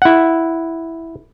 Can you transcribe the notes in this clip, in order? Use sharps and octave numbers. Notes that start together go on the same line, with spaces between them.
E4 F#5